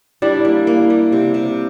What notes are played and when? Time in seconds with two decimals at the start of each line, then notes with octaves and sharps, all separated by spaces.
0.22 G3 D4 E4
0.45 A#3
0.67 A#3
0.90 G3
1.12 C3
1.34 C3